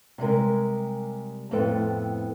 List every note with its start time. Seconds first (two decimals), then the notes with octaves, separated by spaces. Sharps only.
0.18 C3 G3 G#3 A#4
1.51 F2 A2 B3 C4 A4 G5